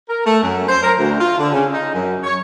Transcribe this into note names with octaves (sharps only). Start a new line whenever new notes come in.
A#4
A3
F#2
C5
A#4
D2
F4
D3
C#3
D#4
F#2
C#5